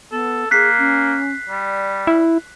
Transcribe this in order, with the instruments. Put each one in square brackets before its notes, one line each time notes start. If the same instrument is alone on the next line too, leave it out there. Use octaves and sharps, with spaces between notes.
[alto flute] B3 [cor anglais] A4
[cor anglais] A#3 [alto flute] G#4 [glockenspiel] F#6 B6 C7
[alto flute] C#4
[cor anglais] G3 [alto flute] D5
[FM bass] E4